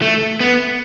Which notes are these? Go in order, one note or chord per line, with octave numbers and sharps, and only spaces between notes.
A3
B3